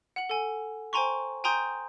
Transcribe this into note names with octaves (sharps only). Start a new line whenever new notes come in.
F#5 F#7
A4 G#5
C5 G5 G#5 A#5 C6 C#6
G5 G#5 A#5 C6 D#6 G6